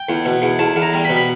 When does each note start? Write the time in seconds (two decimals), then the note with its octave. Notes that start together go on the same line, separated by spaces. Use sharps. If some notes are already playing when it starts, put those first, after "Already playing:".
Already playing: G5
0.09 E2
0.25 B2
0.42 E2
0.59 E2 A5
0.76 E2
0.82 A#5
0.93 G3
1.05 B5
1.09 B2
1.17 B5